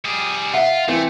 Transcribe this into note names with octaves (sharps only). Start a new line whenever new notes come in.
G3 G#4
F4 E5 F#5
E3 A3 C4